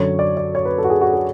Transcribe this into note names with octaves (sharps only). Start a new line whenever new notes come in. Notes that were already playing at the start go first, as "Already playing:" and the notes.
Already playing: F#2 D3 F#3 C#5
D5
D5
C#5
B4
A4
F#4
G#4
F#4
G#4